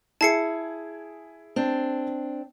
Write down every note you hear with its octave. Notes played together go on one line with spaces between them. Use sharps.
E4 G#4 A5 C7 C#7
C4 D4